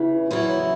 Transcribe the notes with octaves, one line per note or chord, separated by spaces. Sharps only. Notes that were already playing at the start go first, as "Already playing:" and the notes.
Already playing: E2 C#3 E3
E2 C#3 F#3 E4